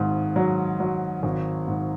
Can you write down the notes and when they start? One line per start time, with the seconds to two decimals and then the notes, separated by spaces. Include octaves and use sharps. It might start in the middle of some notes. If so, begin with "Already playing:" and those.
Already playing: G#1 G#2
0.36 F#3
0.80 F#3
1.23 G#1
1.68 G#2